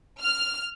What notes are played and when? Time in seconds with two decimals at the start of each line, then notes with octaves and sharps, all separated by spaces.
0.22 F6